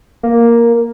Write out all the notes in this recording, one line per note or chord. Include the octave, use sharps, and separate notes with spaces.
A#3